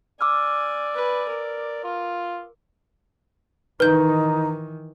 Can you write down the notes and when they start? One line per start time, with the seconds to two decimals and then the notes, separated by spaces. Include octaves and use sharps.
0.21 D5 G#5 D6 E6 F6
0.95 B4 G#5
1.29 A#4
1.84 F4
3.80 D#3 E3 D#4 B4 G6